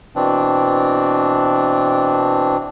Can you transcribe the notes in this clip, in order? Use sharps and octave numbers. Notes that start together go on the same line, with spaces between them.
B2 E3 C4 D4